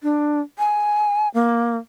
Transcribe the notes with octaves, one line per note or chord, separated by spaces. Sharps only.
D4
G#5
A#3